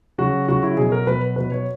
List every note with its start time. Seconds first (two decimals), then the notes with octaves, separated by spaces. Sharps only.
0.18 C#3 F#3 F#4
0.48 C#3 F#3 F#4
0.63 E4
0.77 B2 F#3 G#4
0.92 A#4
1.07 B2 F#3 B4
1.36 B2 F#3 B4
1.52 C#5